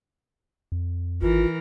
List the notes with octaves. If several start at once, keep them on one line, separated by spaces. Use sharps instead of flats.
F2
G#1 E3 F4 A#4